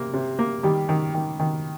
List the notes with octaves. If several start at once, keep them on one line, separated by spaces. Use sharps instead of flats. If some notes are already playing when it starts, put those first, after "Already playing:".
Already playing: C3 A#3
C3
A#3
D#3 G3 G4
D#3
D#3
D#3